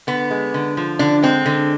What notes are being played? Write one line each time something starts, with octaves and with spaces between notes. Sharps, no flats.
D3 B3
G#3
D3
F3
D3 D4
G#3 C4
D3